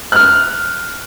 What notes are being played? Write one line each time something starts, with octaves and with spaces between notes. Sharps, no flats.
F6 F#6